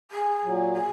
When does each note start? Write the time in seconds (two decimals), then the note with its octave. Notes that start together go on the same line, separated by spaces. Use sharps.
0.11 G#4
0.44 A#2 F#3
0.73 G#4